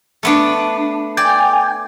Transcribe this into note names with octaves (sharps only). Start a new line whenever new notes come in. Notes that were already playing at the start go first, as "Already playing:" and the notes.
A3 B3 D4
D5 G5 G#5